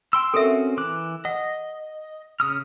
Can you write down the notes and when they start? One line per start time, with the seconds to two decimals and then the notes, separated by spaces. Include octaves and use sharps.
0.13 G5 C6 E6
0.34 C4 C#4 F#4 A4 A#4 E5
0.77 E3 D6 F#6
1.25 D#5 F#5
2.40 C#3 D#6 F6